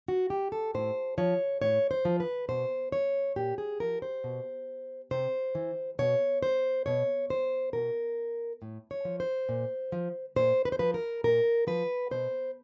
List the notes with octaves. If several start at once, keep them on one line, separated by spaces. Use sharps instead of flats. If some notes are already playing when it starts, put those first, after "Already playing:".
F#4
G4
A4
A2 C5
F3 C#5
A2 C#5
C5
F3
B4
B2 C5
C#5
A#2 G4
G#4
F3 A#4
C5
B2
C3 C5
E3
B2 C#5
C5
B2 C#5
C5
B2 A#4
A2
C#5
F3
C5
A#2
F3
A#2 C5
B4
C5
F3 B4
A#4
A#2 A#4
F3 B4
B2 C5